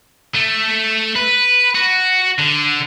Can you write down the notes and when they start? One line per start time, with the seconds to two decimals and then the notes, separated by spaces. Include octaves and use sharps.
0.35 A3
1.16 B4
1.75 F#4
2.38 D3